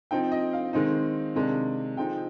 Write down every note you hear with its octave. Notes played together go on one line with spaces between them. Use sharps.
F3 C4 D#4 G5
D#5
F5
D#3 G#3 C4 D#4
C3 D#3 G#3 D4
C3 F3 G#3 C4 D#4 G5